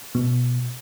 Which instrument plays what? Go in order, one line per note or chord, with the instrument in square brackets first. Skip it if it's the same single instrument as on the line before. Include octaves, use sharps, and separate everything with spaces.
[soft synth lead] B2